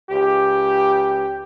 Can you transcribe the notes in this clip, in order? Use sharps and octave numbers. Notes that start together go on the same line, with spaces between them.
C#2 G4